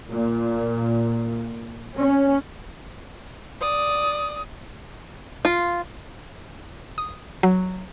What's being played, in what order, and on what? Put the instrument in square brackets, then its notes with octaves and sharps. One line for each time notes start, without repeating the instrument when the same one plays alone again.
[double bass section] A#2
C#4
[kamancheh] D5 D#6
[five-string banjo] F4
[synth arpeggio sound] D#6
F#3